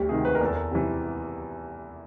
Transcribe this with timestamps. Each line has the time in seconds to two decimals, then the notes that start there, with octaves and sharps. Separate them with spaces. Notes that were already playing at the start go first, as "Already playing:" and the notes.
Already playing: D2 F#4 G4
0.09 C3 D#3 G#4
0.25 B4
0.35 A#4
0.41 E2 A4
0.55 A#4
0.71 C3 E3